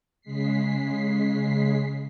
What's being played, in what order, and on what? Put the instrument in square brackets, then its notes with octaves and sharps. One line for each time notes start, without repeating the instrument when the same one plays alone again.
[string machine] C#3 G#3 B6 C7